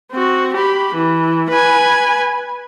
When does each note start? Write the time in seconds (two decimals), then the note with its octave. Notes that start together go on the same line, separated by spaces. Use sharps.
0.12 C4 F#4
0.54 G4 B5
0.94 E3
1.50 B4 G#5